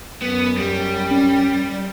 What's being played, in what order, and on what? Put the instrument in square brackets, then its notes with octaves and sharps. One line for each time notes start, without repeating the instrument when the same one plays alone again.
[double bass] F#2 [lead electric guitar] B3
[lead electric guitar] G3
[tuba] C#4